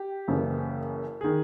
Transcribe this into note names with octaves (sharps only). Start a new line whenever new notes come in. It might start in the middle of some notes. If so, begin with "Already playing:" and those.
Already playing: G4
F#1 F#2 C#3 E3
D#3 G#4